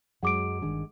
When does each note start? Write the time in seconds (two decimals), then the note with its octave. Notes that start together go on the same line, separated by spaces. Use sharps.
0.23 F#2 F#3 G#3 F#5 D6 D7
0.62 G1 D#3 G#3 D4